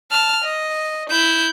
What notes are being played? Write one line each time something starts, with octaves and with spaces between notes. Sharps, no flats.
A5 F6
D#5
E4 G6